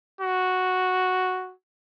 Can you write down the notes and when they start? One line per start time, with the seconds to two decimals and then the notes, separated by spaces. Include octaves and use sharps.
0.21 F#4